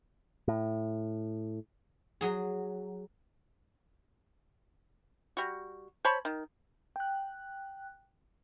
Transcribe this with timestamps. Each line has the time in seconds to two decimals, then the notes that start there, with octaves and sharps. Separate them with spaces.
0.48 A2
2.21 F#3 G#4
5.37 G3 F#4
6.05 C5 C#5 A5 B5
6.25 D#3
6.96 G5 F#6